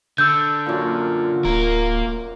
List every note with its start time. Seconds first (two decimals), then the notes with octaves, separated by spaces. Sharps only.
0.18 D3 E6 G6
0.66 F#2 A#2
1.45 D1 A#3 A#4